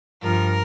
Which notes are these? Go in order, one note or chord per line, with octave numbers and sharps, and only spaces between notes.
G2 F3 A#4